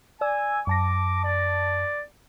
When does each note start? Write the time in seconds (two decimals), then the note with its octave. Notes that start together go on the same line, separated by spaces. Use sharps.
0.21 D5 G#5 E6
0.67 F#2 A5 D6 A#6
1.25 D5